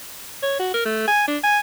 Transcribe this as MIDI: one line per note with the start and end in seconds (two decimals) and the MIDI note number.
0.43 0.55 73
0.60 0.72 66
0.74 0.85 70
0.85 1.03 57
1.08 1.26 80
1.28 1.38 62
1.43 1.59 80